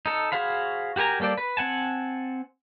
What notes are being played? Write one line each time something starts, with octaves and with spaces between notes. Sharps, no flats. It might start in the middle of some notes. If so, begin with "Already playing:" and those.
D#4 A4
F#4 G#4 C5 F5 B5
F#4 G4 A#4 G#5 A#5
G3 A#3 A4 C5 D5
B4
C4 F#5 G#5 A5